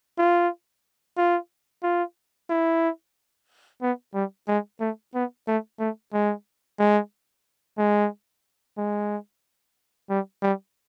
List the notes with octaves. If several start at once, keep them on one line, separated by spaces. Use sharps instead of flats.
F4
F4
F4
E4
B3
G3
G#3
A3
B3
A3
A3
G#3
G#3
G#3
G#3
G3
G3